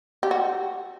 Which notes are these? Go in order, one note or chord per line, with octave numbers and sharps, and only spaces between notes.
G4
F#4